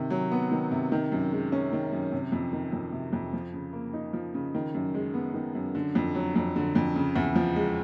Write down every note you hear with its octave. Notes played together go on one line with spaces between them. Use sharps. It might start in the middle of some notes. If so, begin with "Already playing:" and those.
Already playing: C3 D#3
F#3
B3
D#3
C3
D#3
F#2
G#3
C#4
D#3
F#2
C3
F2
D#3
F2
C3
F2
F3
C#3
A#3
D#4
F3
C#3
D#3
F#2
G#3
B3
D#3
F#2
D3
F2
F#3
F2
D3
F2
C#3
E2
F3
G#3